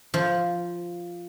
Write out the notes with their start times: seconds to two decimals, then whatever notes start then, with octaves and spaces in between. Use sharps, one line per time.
0.14 F3